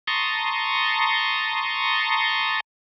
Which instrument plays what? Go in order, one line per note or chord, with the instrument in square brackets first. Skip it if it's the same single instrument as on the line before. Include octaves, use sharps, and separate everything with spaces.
[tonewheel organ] A5 A#5 C6 C#6 D#6